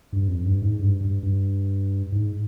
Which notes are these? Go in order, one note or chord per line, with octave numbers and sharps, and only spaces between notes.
G2
F2
G2
G#2
G2
G2
G2
G#2